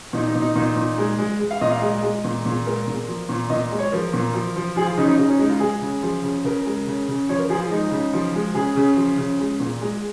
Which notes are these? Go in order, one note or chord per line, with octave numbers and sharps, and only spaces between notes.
A#2 D#4
D#4
A#2
D#4
A#2 D#4
A#2
G#3
G#3
G#3
F5
A#2 D#5
F5
G#3 D#5
G#3
A#2
A#2
G#3 A#4
A#2
F3
A#2
A#2 D#5
G#3
C#5
F3 A#4
A#2
F3
F3
F3 G#4
F4
C#3 D#4
D#4
C#3 D#4
C#4
G#3 D#4
F4
G#3 G#4
C#3
F3
C#3
C#3 A#4
G#3
C#3
C#3
F3 C#5
A#4
F3 G#4
F4
G#3 D#4
C#3
F3
G#3
C#3 G#4
C#3
F3
C#3
G#3
A#2
G#3